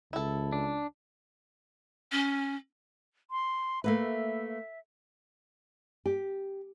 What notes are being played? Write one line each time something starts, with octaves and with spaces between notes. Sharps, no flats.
C#2 E4 A4
D4
C#4
C6
A3 A#3 B4 E5
G4